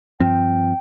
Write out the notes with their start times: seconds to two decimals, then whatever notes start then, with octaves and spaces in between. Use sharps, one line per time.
0.20 G2 F3 C4 G5